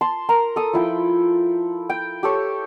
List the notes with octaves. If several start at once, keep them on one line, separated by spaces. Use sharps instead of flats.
A5 C6
A#4 A#5
A4 D#6
F3 E4 G5
G5
G4 A4 C#5